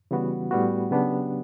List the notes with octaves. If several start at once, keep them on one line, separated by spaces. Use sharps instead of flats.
C#3 E3 G3 B3 F#4
A2 G3 B3 F#4
C#3 F#3 B3 D4 G4